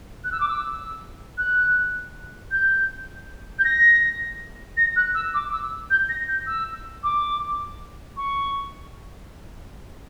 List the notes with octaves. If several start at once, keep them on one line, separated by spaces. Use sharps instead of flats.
F#6
E6
D6
E6
F#6
G6
G6
A#6
A#6
F#6
E6
D6
E6
G6
A#6
G6
E6
D6
C#6